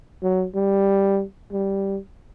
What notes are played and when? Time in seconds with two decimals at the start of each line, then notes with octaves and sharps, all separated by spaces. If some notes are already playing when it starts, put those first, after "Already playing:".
0.23 F#3
0.55 G3
1.52 G3